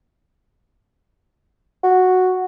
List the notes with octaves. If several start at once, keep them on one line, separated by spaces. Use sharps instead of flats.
F#4